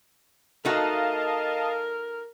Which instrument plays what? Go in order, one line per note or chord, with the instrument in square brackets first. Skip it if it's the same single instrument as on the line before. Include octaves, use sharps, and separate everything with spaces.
[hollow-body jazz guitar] A3 D#4 F#4 [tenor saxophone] A#4 [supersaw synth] D#5 F5 A5